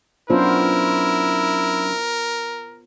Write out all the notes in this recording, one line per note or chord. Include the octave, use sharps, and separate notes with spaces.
F#3 B3 C#4 D4 E4 F4 A#4 C5